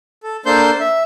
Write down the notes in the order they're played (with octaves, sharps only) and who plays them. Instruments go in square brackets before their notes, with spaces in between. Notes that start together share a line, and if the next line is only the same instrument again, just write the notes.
[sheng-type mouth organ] A4
A#3 D4 A4 C5 C6 G6
E5